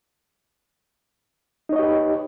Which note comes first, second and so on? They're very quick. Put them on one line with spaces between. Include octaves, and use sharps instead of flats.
D#4 C#5 D#5 G4 B4